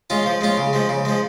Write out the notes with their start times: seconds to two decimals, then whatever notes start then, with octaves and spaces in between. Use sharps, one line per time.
0.10 G#3 C#4 F4
0.26 F3
0.41 G#3 C#4 F4
0.57 C#3
0.73 F3 G#3
0.89 C#3
1.05 F3 G#3